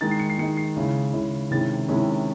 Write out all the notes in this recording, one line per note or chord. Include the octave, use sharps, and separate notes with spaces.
D#3 G#3 D#4 A6
C7
C#7
C7
D#3 G#3 D#4 C#7
C7
C#3 G#3 C#4 E4
C#3 G#3 C#4 E4
C3 D#3 G#3 C#4 E4 A6
C3 D#3 G#3 C#4 E4